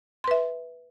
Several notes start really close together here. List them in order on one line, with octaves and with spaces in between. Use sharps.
C6 B4 E5